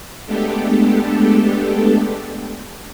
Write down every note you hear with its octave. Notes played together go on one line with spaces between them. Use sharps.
G#3 A3 B3 D4 G4 A4